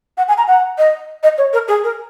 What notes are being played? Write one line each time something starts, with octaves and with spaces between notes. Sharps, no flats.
F#5
G#5
A#5
F#5
D#5
D#5
C#5
A#4
G#4
A#4